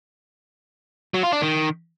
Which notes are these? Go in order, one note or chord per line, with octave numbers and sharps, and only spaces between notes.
F#3
F4
D4
D#3